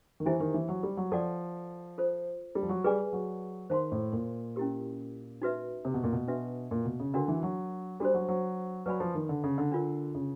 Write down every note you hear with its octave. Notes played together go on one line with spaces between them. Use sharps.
D#3
E3 E4 G4 C5 E5 G#5
D#3
E3
F#3
G3
F#3
F3 A4 D5 F#5 A5
F4 A4 C5
G3
F3
F#3
G3 G#4 B4 D5 F5 G#5
F#3
D#3 C5 F5 A5 C6
A2
A#2
C#4 E4 G4 A#4
D#4 F#4 B4 E5
C3
B2
A#2
B2
D4 F#4 B4 E5
A#2
B2
C#3
D3 D4 F#4 A#4
E3
F#3
G3 D4 F#4 A4 C5
F#3
F#3
F#3 B4 D5 F5 G#5 B5
F3
D#3
D3
C#3
D3
D4 F4 A#4
C#3